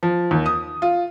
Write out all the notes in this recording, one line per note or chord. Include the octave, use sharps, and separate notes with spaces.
F3
D#2
D#6
F4